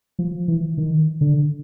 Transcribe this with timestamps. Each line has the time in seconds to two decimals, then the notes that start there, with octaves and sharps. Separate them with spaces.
0.19 F3
0.48 E3
0.78 D#3
1.21 D3